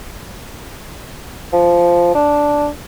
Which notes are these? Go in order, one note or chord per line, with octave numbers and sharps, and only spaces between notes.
F3
D4